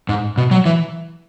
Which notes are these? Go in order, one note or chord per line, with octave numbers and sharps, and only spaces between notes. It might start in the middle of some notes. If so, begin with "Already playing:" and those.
G#2
B2
F#3
E3